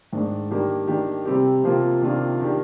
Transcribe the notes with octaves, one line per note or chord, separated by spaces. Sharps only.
G#2 D#3 G#3 D4
D#3 G3 A#3 D4 G4
D#3 A#3 D4 G4
C3 G3 C4 G4
C3 F3 A#3 F4
C3 D#3 A#3 D4 F4
D#3 A#3 D4 G4